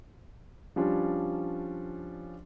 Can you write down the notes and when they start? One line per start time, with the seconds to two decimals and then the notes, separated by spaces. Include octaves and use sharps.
0.76 F3 G3 C#4 D4 F4